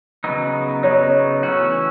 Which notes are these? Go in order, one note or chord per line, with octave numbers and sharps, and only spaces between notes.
C#3 F#3 B3 D#4
C#3 F#3 B3 D#4 C#5
E3 A3 C#4 F#4